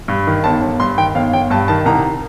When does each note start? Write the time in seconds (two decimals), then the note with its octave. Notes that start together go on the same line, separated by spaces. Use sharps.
0.08 G2
0.27 D#3
0.44 G1 A5
0.62 G1
0.80 G2 C6
0.98 D#3 G5
1.15 G1 F5
1.33 G1 G5
1.50 G2 A5
1.68 D#3 A5
1.86 C2 A#5